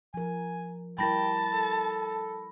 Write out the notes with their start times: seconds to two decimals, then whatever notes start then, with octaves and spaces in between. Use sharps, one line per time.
0.14 F3 A#4 G#5
0.99 G3 E4 A#4 G5 A5 B5 A#6
1.54 A4